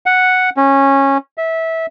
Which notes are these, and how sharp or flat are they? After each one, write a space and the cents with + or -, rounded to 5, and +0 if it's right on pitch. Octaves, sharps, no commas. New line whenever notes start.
F#5 +0
C#4 -15
E5 -20